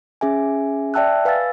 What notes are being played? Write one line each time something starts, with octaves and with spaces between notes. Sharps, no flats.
C#4 G#4 E5 G#5
D5 E5 G5 A5 E6 F#6
B4 F5 G#5 E6 A6